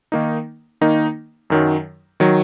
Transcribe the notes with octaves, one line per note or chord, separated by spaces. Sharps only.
D#3 A#3 D#4
D#3 A#3 D#4
F#2 D#3 F#3
D#3 F#3